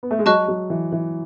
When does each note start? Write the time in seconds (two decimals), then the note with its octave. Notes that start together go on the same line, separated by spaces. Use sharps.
0.03 B3
0.11 A3
0.19 G#3
0.26 F#3 D#5 A5 C#6 F#6
0.48 F#3
0.70 E3
0.92 E3